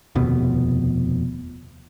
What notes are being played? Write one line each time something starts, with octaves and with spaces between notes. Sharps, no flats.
F1 D#2 B2 B3